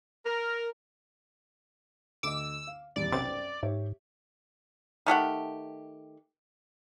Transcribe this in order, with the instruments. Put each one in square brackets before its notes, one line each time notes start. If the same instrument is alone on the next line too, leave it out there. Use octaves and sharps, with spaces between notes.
[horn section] A#4
[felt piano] D2 D#5 [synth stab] D6 [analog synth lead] E6
[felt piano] F5
[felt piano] D#1 E2 G3 [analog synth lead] D5
[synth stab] B1 C3 A6 [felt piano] F#2 C5 G5
[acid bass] G#2 [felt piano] G4 C#5 E5
[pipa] D#3 A3 G4 F#5